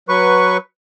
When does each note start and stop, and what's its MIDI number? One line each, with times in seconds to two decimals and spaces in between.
0.09 0.57 54
0.09 0.57 71
0.09 0.57 85